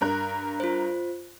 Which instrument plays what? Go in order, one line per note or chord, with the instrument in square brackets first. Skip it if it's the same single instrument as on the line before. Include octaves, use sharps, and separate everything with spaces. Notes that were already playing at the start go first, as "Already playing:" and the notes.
[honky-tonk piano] G2 A#4 F#6
[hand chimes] F4 C5